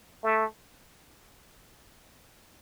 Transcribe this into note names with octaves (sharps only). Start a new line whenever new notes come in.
A3